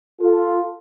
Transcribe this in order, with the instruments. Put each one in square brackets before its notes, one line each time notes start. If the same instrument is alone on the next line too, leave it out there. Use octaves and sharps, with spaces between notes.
[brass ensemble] F4 A4